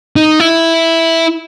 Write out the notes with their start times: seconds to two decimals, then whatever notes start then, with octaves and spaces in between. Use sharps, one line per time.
0.16 D#4
0.40 E4